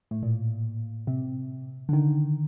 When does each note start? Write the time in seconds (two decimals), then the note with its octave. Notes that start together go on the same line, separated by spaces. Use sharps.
0.11 A2
0.23 A#2
1.07 C3
1.89 D3
1.93 D#3